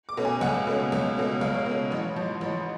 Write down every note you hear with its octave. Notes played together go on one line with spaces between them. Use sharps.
D6
B2 A3 C#4
G#5
C#2 F#5
B2 A3 C#4
C#2
B2 A3 C#4
C#2 F5
C#5
B2 A3 C#4
A1 C#5
G#2 F3
A1